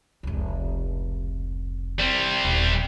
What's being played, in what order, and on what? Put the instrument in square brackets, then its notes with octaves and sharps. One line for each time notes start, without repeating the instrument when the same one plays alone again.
[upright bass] F1 C#2
[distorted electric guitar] G3 C4
[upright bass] D#1